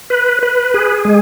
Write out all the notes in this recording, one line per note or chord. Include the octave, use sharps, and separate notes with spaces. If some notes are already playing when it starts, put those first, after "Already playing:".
B4
B4
G#4
G#3